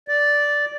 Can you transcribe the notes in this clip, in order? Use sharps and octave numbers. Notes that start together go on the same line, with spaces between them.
D5